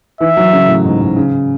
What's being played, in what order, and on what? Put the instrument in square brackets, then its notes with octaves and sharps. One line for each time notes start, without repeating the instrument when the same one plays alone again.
[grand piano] E3 [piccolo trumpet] E5
[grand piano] F#3
C#3
A2
G#2
G#2
C#3